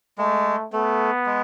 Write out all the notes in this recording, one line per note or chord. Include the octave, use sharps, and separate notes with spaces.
G#3 A3
A3 B3
G#3